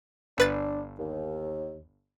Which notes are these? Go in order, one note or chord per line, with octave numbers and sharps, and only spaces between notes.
G1 D4 B4 A6
D#2